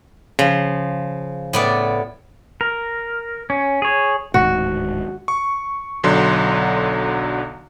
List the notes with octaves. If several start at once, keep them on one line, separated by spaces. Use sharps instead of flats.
C#3 F3
A2 B3 D5
A#4
C#4
G#4 C#5
D1 G#2 D#3 F#4
C#6
B1 D3 F#3 C6